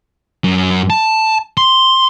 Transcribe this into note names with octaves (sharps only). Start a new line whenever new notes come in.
F#2
A5
C6